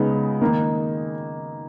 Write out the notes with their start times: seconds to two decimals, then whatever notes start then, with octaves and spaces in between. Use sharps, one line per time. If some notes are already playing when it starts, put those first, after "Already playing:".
Already playing: C#3 G#3 B3 D#4
0.41 D#3 A#3 D#4